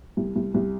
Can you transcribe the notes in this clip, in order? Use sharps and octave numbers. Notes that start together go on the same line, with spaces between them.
C2
C2
C2